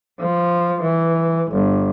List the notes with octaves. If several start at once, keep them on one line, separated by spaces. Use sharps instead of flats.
F3
E3
G1